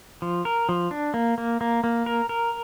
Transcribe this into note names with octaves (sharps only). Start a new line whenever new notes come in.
F3
A#4
F3
D4
A#3
A#3
A#3
A#3
A#4
A#4